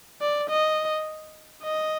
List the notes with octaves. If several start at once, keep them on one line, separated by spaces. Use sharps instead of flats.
D5
D#5
D#5